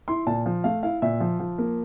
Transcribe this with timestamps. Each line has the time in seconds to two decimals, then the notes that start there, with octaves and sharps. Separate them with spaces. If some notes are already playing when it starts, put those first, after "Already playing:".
0.08 E4 C6
0.27 A#2 A5
0.46 F3
0.64 A3 F5
0.83 E4 F5
1.02 A#2 E5
1.20 F3
1.40 F3
1.58 A#3